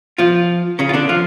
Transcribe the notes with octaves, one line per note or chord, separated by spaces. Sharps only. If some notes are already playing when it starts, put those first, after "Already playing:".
F3 F4
C#3 C#4
F4
D3 D4
F3 F4